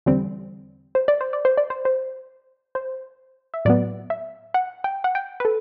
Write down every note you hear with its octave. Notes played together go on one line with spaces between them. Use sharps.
E2 D3 G3 C4
C5
D5
C5
D5
C5
D5
C5
C5
C5
E5
A2 F#3 B3 D5
E5
F#5
G5
F#5
G5
B4
A4